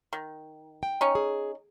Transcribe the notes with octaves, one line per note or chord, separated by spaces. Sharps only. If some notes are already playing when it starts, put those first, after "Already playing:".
D#3
G5
C#4 D#4
G#4